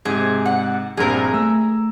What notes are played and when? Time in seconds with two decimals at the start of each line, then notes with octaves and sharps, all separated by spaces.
0.05 G#2 C3 G#4
0.46 F#5
0.97 A#1 G2 C4 G#4 A#4
1.34 A3 E6